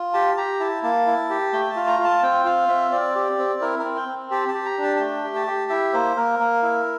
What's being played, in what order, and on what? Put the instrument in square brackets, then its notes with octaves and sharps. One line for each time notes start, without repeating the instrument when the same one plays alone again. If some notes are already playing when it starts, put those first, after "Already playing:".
Already playing: [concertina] F4
G4 A5
G4 A#5
E4 A5
A#3 A5
E4
G4
A3 G5
A5
F4
A#5
F4
A5
C4 G5
F4 F5
C4 E5
C4 D5
G4
C4
E4 A#4
A#4
C4
G5
C4
G4 A5
A5
G4
A#5
D4
A5
A5
A3 G5
G4
A5
G4
E4 E5
A#3 C5
A#3 A#4
A#3
E4